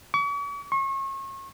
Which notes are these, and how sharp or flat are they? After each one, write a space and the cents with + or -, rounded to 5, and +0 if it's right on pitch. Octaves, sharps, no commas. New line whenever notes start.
C#6 +45
C#6 -35